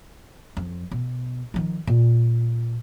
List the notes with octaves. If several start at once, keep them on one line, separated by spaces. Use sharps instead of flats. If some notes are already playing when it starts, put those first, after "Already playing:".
F2
B2
D#3 F3
A#2